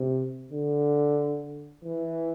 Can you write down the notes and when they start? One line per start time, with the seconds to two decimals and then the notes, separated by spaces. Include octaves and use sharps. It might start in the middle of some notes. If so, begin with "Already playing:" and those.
Already playing: C3
0.52 D3
1.85 E3